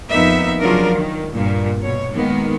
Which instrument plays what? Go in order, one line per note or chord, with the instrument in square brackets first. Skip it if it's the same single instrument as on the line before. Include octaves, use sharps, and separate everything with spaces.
[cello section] F2 A#3 B3 D#4 E5
C#3 F3 F#3 D4 F4 A#4
D#3
G2 A#2
B2 C#5
D#3 G#3 A#3 B3